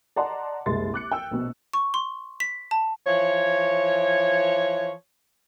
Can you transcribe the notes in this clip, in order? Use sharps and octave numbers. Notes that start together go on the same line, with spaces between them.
D5 D#5 F#5 A5 A#5 C6
F#1 C2 G#3 C6 A6
D6 F#6 C#7
G5 E6
A#1 B2
C#6
C6
B6
A5
E3 F3 C#5